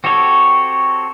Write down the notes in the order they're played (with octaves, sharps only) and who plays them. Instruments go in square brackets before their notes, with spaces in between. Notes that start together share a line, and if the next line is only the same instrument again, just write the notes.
[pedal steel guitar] C4 F#4 G4 A4 C#5